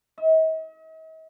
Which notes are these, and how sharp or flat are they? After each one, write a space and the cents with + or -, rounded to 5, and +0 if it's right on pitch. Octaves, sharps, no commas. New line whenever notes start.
D#5 +45